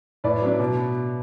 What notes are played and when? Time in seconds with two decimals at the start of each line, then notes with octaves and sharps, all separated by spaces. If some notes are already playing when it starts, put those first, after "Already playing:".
0.24 A2 B4 D5
0.42 F#3 B3 D4
0.60 B2